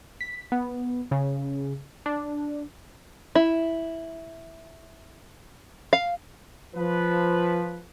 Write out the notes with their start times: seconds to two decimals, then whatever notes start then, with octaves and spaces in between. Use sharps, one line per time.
0.21 B6
0.52 B3
1.11 C#3
2.06 D4
3.35 E4
5.93 F5
6.74 F3 B4